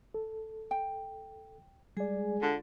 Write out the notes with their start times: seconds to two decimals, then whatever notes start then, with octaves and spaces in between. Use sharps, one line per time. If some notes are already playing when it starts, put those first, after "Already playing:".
0.14 A4
0.71 G5
1.97 G3 G#3 G#4 D5 G#5
2.42 D3 F4